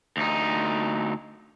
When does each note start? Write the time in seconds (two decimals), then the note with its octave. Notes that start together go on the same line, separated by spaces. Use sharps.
0.17 D2 D#4